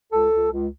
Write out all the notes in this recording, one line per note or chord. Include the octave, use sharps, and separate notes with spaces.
C#2 A4
C#2
C#2